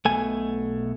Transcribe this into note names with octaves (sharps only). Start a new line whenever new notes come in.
B1 B2 A3 G#5